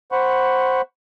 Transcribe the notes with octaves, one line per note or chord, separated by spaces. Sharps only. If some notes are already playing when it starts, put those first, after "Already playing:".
C5 F#5 B5 C#6